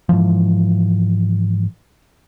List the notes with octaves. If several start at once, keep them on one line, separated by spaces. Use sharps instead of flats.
G#2 C#3 E3 F3